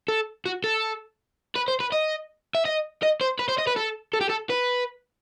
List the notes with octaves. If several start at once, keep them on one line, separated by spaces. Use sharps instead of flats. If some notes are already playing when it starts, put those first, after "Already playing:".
A4
F#4
A4
B4
C5
B4
D#5
E5
D#5
D#5
C5
B4
C5
D#5
B4
A4
A4
G4
A4
B4